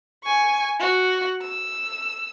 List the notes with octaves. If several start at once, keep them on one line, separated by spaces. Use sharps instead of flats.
G#5 C#6
F#4
E6